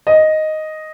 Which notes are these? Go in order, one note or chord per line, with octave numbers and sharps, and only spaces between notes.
D#5